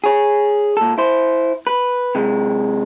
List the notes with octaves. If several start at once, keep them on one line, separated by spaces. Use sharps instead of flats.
G#4 C#5
A#2 A4
E4 C5
B4
C3 G#3